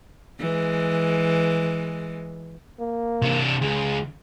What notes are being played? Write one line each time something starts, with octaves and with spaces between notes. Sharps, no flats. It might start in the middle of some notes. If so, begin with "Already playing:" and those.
E3 G#3
A#3
C3 D4
C#2 G#4